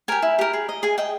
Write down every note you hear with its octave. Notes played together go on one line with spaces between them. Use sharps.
G4 A#4 G#5
E4
G4 A#4
G#4
D#5
G#4 G#5
D#5 G5